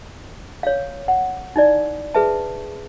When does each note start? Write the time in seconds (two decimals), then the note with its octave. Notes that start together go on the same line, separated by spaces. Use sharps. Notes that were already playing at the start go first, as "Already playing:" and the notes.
0.63 C#5 F5
1.08 F#5
1.56 D#4 E4 D5
2.14 G#4 B4 E5 A5